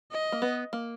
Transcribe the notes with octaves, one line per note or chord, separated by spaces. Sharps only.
D#5
A#3
B3
A#3